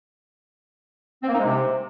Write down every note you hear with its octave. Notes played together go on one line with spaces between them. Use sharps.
C4
A#3
D#4
G#3
C3